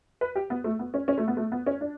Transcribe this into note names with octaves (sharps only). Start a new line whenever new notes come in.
B4
G4
B3
A3
B3
C#4
C#4
A3
B3
A3
B3
C#4
D4